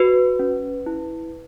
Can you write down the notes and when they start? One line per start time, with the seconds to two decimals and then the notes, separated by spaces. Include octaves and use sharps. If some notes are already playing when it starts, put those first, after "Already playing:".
Already playing: F#4 B4
0.39 C#4
0.86 E4